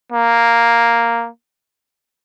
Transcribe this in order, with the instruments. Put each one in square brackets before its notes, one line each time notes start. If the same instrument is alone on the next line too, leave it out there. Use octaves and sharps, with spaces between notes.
[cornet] A#3